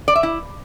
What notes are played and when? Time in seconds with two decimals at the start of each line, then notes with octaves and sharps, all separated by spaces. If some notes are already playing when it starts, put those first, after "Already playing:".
0.08 D5
0.15 E5
0.23 E4